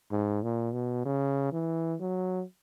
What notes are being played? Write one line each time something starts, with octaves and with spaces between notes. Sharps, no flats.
G#2
A#2
B2
C#3
E3
F#3